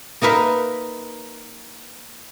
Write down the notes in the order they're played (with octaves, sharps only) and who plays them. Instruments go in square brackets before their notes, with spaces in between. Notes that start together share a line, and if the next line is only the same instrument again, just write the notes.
[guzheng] A#3 D#4 A#4 B4 E5